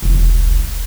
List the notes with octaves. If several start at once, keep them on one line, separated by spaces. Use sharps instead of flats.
E1 C2